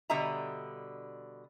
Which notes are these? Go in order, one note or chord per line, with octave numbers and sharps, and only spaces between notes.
B2 D3 G3 D#5 E5 A#5